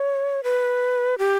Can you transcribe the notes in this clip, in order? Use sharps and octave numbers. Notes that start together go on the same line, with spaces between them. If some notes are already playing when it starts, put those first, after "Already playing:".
Already playing: C#5
B4
G4